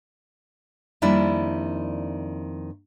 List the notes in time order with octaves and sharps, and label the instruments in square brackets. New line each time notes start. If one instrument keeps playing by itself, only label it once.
[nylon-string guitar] F2 D#3 G3 A#3 D4 E4